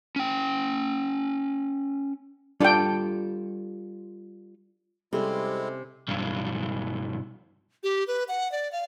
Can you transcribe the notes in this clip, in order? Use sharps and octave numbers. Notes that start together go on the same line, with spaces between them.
C#4 G5
G3 D4 F4 A4 G5
C3 G3 G#3 C4 C#4 E4 A4
B1 G2
G4
B4
F#5
D5
F5